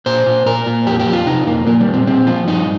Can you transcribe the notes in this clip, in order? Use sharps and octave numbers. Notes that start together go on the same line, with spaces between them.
A#2 C5
A#2
A#2 A#4
A#2
F2 G4
G4
F2
F4
C3 D#4
F2 A#3
A#2 A#3
G3
A#2
C4
A#2 C4
F3 F4
G2 D#4